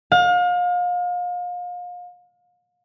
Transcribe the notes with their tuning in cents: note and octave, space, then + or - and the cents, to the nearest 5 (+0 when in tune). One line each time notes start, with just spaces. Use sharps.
F5 +35